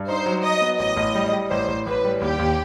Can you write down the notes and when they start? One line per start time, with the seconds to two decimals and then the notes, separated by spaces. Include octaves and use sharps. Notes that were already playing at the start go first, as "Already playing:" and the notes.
Already playing: G2
0.08 D#4 C5
0.26 F#3
0.43 F#3 D#5
0.62 B3
0.79 A1 D#5
0.97 A1
1.15 G3
1.33 G3
1.50 A1 C5
1.68 A1
1.86 A1 B4
2.04 G3
2.21 D#2 G4
2.39 D#2